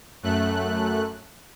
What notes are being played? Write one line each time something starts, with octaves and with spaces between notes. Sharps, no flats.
F#2 A3 F#6